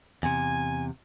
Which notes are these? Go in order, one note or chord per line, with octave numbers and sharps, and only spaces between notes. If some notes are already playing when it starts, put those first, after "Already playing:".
E2 C3 G#5